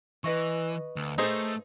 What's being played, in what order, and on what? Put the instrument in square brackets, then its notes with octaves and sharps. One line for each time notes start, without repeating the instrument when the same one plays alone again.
[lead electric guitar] E3 [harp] B4 D#5 C#6
[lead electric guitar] D2
[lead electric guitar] A3 [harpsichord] D#4 G#4 C5